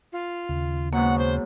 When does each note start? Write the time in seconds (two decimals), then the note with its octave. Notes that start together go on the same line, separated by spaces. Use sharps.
0.13 F4
0.49 D#2 C#3
0.93 G#2 B2 F#3 A#3 F#5
1.18 C5